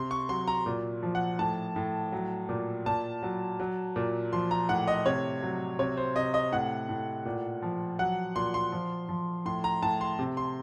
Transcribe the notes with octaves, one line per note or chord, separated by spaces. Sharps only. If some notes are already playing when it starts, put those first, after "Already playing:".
Already playing: C3 C6
C#6
F#3 C6
A#5
A#2
F3
F#5
A2 A5
A2
F#3
A#2
A#2 A5
F#3
F#3
A#2
F3 C6
A#5
A2 F#5
D#5
C3 C#5
F#3
C3 C#5
C5
C3 D#5
D#5
A2 F#5
A2
A#2
F3
F#3 F#5
A#2 C6
C6
F3
F3
A2 C6
A#5
A2 A5
C6
C3
C6